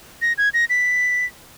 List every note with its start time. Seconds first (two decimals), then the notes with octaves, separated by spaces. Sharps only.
0.22 A#6
0.38 G#6
0.54 A#6
0.70 B6